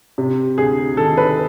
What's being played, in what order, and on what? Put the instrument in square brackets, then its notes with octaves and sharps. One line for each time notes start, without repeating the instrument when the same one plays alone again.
[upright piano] C3
D2 G#4
D#3 A4
B4